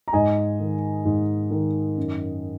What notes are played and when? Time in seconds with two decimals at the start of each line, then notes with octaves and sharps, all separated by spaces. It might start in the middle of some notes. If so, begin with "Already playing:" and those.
0.08 A#5
0.13 G#2 D#5 G#5
0.60 D#3
1.05 G#2
1.51 D#3
1.97 F#2